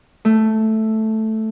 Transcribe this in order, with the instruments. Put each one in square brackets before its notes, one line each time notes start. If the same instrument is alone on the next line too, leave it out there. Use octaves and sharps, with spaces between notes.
[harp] A3